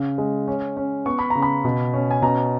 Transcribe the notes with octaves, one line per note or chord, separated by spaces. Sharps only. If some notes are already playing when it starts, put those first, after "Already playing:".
Already playing: C#3
G#3
C#4
C#4
B3 C#6
B5
C#3 A#5
B5
B2
C#4
G#5
B2 A#5